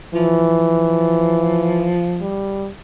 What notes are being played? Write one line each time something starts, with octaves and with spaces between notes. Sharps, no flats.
E3 F3
G3